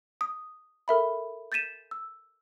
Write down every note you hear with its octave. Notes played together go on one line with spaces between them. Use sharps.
D#6
A4 A#4 E5 B5
G6 A6 B6 D#7 E7
E6